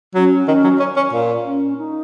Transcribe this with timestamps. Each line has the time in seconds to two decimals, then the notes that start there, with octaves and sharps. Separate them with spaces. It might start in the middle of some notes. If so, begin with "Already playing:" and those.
0.15 F#3 C#4
0.47 D#3 C#4
0.64 F#3
0.80 C#4
0.96 C#4
1.13 A#2
1.45 C#4
1.77 D#4